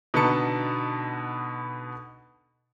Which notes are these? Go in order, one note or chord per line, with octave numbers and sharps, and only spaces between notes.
B2 D3 B3 D#4 A5 C#7